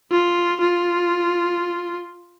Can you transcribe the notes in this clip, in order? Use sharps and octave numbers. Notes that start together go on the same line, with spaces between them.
F4
F4